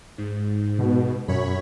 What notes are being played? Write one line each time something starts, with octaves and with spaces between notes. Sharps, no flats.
G#2
B2
F#2 C#5 B5